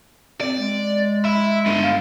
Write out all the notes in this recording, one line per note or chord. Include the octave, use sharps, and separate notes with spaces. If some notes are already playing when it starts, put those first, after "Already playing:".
C4 D5
G#3
E4
G2 D3
F5